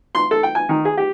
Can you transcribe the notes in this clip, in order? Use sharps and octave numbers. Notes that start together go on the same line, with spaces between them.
C6
A4
G5
G#5
D#3
G#4
G4